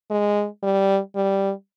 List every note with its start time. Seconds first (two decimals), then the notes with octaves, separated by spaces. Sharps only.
0.11 G#3
0.63 G3
1.16 G3